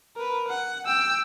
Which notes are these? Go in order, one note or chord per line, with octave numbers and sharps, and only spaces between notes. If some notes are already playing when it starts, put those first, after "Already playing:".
A#4 B4
F#5
G5 E6